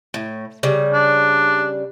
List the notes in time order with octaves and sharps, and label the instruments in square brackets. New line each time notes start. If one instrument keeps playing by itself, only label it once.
[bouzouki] A2
C#3 G3
[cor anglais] D4